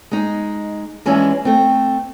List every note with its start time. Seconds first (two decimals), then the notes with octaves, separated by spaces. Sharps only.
0.11 G#3 D#4
1.06 E3 G#3 C#4 D4 E4 F4
1.45 A3 C4